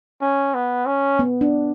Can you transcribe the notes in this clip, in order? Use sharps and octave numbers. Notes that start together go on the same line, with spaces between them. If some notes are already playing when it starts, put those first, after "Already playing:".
C#4
B3
C#4
B3
D4